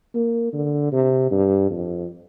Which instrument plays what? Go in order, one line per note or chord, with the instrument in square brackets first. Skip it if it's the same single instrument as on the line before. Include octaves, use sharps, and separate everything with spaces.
[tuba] A#3
D3
C3
G2
F2